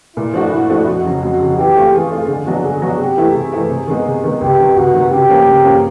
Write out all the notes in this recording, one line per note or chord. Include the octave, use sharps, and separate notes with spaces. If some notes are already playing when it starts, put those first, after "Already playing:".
A#2 E4
F3 A3 D4 F#4
A#2 E4
F3 A3 D4 F#4
F2 F#4
C#3 F#3
F2 F#4
C#3 F#3
E3 G4
A3 C4 F4
E3 G#4
A3 C4 F4
D3 G#4
F#3 B3 D4 F#4
D3 G#4
F#3 B3 D4 F#4
C3 G4
E3 A3 C4 E4
C3 G#4
E3 A3 C4 E4
C3
D#3 G#3 B3
C3
D#3 G#3 B3
C#2 G4
C3 D#3
C#2 F#4
C3 D#3
C#3 G4
F3 A#3 C#4
C#3
F3 A#3 C#4